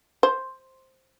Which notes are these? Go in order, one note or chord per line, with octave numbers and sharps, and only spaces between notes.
C5